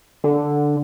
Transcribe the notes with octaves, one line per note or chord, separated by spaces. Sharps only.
D3